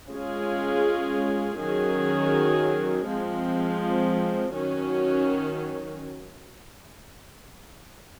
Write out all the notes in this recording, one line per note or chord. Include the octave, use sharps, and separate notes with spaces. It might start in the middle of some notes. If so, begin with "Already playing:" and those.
G#3 C#4 F4 G#4
D#3 F#3 C#4 G#4
F3 G#3 C4
D#3 F#3 C#4 F#4